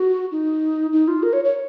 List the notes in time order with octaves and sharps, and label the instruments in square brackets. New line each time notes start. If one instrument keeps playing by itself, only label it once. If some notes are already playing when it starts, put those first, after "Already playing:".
Already playing: [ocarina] F#4
D#4
D#4
F4
A#4
C#5
C#5